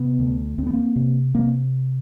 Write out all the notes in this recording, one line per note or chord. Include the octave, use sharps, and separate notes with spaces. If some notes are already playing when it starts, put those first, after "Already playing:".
Already playing: C3 B3
D2
D2 C4
B3
A#3 C4
C3
C3 A#3 C4